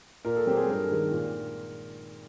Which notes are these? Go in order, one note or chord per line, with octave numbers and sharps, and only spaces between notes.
A#2 A#4
A4
F#3 A3 C4 G4
G#4
G2 A#4
D#3 G#3
A#2